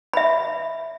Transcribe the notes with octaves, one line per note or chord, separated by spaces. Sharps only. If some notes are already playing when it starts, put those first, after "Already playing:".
E5 B5